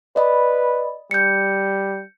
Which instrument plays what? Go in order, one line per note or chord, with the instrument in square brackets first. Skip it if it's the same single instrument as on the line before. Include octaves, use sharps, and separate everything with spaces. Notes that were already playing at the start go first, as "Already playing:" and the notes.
[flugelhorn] B4 [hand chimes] D5 D#5 B5
[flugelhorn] G3 [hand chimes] G6 C#7